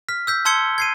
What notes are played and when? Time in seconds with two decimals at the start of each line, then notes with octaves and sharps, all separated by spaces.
0.09 F6 B6
0.27 E6 G6 B6
0.45 A5 C6 E6 G#6 C#7 G7
0.78 G#6 C7 D#7